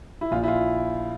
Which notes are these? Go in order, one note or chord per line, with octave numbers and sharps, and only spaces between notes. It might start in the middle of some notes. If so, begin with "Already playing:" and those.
E4
A#1 F4
E4
F4